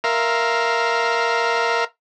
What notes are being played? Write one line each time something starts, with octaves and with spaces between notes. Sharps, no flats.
A#4 E5 F5 A#5 C6